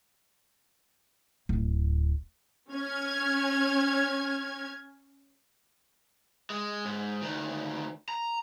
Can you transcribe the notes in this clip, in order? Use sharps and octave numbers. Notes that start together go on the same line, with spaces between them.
D1
C#4 F6 G#6
G#3
G#2
D2 D#3
A#5